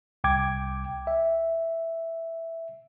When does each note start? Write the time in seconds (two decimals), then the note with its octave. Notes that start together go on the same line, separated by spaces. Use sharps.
0.24 C2 G5 D6 G#6
1.07 E5